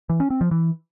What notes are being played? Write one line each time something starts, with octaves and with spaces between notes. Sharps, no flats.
E3
C#4
C4
F3
E3